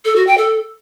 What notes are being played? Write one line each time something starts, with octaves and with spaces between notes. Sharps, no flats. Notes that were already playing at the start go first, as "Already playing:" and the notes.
A4
F#4
G5
A4